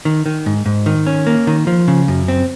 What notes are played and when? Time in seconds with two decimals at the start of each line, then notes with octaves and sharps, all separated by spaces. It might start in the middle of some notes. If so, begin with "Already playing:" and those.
0.05 D#3
0.26 D#3
0.46 G#2
0.66 G#2
0.86 D#3
1.07 C#4
1.27 A#3
1.47 D#3
1.67 F3
1.88 C#3
2.08 F#2
2.28 C4